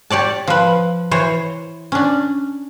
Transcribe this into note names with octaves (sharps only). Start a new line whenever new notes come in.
G4 C#5 D5 A5
F3 B4
E3 C5 C#5
C#4 D4